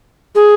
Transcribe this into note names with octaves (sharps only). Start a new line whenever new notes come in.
G#4